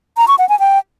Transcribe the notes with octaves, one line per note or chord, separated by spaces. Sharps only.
A#5
C#6
F#5
G#5
G5